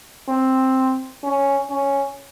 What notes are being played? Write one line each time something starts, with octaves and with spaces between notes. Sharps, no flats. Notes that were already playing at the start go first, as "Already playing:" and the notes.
C4
C#4
C#4